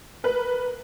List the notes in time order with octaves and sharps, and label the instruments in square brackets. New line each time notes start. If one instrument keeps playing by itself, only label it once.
[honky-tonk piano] A#4 B4